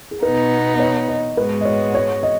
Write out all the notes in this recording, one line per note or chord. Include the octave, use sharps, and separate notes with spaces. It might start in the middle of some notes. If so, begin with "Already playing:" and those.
G#4
B2 B3 D#4 B4
D#5
C#5
D#5
G#2 G#3 B3 F#4 B4
D#5
C#5
C#5
D#5